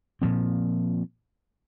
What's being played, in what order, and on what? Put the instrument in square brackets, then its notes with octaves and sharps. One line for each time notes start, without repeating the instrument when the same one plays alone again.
[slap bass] A#2 F3 C4